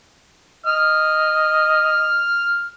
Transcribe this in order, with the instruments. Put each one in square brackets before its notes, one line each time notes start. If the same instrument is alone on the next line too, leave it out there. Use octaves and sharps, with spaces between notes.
[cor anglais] D#5 [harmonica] F6